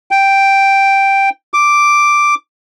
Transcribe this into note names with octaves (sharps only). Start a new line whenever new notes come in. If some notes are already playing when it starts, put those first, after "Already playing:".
G5
D6